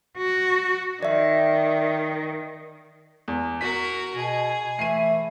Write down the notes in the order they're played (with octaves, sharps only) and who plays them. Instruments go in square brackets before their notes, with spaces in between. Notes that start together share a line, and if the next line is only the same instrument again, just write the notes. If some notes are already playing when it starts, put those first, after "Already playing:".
[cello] F#4
[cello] D#3 [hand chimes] D5 E5
[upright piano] E2
[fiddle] F#4 A#4 [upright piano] B6
[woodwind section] B2 [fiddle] G#4
[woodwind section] E3 A3 [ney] E5 [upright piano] C7 D#7